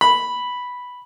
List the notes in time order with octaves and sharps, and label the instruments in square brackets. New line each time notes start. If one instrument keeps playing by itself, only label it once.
[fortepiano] B5